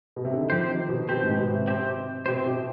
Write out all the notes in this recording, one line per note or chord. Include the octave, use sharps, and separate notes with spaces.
B2
C3
D3
D#3
F3 C4 G4 C5
D#3
B2
B2 C4 G4 C5
G#2
B2
C3
C4 G4 C5
B2 C4 G4 C5
B2